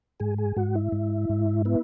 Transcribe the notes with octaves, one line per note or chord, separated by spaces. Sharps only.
G#2 G#4
G#4
G#2 F#4
E4
G#2
G#2
B3 E4